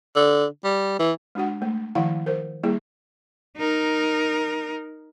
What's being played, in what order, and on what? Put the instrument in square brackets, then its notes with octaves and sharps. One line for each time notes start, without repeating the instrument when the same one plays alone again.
[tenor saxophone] D3
G3
E3
[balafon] G#3 D4 F#4 F#5
G#3 A3
D#3 F3 E4 F5 F#5
A#4 C5
G3 A#3 E4 G#4
[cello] D#4 A#4